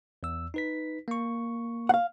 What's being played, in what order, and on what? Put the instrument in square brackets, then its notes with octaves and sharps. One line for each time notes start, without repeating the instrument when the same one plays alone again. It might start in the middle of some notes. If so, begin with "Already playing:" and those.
[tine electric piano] E2 E6
D#4 B4 B6
A#3 C#6
[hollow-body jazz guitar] F5 F#5